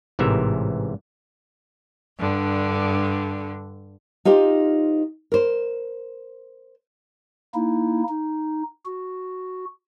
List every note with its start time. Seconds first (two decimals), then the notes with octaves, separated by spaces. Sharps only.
0.19 A1 G#2 C3 E3 A#4 E5
2.17 G2 D3
4.25 D#4 F4 G4 C5
5.32 A#4 C5
7.54 A#3 D#4 E4
8.09 D#4
8.86 F#4